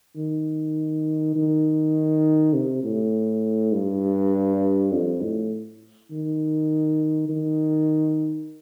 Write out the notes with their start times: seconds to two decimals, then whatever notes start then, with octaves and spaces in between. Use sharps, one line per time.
0.16 D#3
1.36 D#3
2.54 C3
2.84 A2
3.73 G2
4.92 F2
5.21 A2
6.11 D#3
7.29 D#3